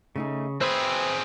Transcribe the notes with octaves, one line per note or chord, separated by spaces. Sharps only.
C#3 A3 D#4 G#4
C4 G#4 B4 C5 E5